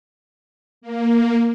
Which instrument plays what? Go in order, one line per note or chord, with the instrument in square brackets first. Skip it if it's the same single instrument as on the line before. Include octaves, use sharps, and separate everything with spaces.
[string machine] A#3